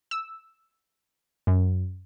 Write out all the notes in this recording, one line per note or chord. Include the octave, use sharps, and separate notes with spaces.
E6
F#2